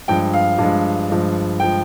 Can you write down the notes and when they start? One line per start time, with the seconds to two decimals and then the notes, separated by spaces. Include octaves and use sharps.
0.08 G2 F3 G#3 G5
0.34 F5
0.59 G2 F3 G#3
1.10 G2 F3 G#3
1.60 F3 G#3 G5